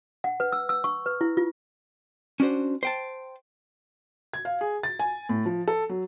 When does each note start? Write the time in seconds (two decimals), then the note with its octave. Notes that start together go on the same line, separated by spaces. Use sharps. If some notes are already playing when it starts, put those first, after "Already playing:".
0.24 F#5
0.40 B4
0.52 E6
0.69 E6
0.84 C#6
1.06 B4
1.21 E4
1.37 F4
2.40 C#4 D4 F#4 C5
2.83 C5 G5 A5
4.33 G#6
4.45 F5
4.61 G#4
4.83 A6
4.99 G#5
5.29 A2
5.46 F3
5.68 A4
5.89 F#3